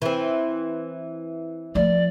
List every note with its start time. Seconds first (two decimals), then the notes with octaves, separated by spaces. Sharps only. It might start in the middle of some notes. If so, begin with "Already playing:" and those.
0.02 E3 C4
1.75 F3 A3 D5